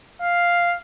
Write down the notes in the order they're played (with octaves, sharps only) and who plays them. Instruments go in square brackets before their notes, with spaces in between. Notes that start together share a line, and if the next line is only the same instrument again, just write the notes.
[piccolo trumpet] F5